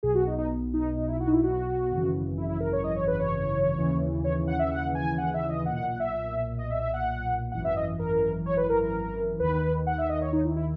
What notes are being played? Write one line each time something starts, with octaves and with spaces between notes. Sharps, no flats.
B1 B2 G#4
F#4
D#4
D#4
D#4
D#4
E4
F#4
D#4
E4
F#4
G#1 F#2 C#3 E3
E4
E4
A#4
C#5
D#5
C#5
B4
C#5
D#2 C#3 E3
C#5
F#5
E5
F#5
G#5
F#5
E5
D#5
B1 A#2 F#5
F#5
F#5
E5
D#5
E5
E5
F#5
G#1 F#2 E3 F#5
E5
D#5
A#4
C#5
B4
A#4
A#4
D#2 D#3 B4
F#5
E5
D#5
C#5
D#4
E4
E4